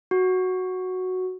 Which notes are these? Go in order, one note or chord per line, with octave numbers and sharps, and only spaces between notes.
F#4